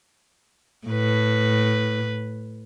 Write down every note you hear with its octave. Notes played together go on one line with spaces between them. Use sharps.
A2 B4